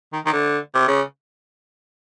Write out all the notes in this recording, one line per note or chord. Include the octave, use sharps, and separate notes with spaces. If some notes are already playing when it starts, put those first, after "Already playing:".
D#3
D#3
D3
C3
C#3